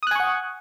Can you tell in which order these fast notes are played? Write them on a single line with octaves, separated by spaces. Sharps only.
D#6 F#6 G#5 C#6 F#5